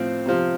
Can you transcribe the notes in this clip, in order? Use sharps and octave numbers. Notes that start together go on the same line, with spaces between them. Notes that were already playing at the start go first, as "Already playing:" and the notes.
Already playing: A2 F3 C4
C3 F3